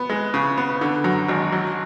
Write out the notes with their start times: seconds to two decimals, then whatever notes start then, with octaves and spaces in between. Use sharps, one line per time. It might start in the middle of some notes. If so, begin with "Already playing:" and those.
Already playing: B3
0.09 G#3
0.34 C#3
0.58 B3
0.81 D3
1.04 F#2
1.29 G#1
1.52 F#3